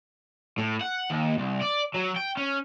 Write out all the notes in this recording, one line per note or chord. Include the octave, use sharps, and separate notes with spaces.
A2
F#5
D#2
C2
D5
F#3
G5
C#4